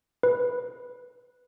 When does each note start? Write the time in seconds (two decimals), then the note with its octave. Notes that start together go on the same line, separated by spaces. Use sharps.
0.23 B4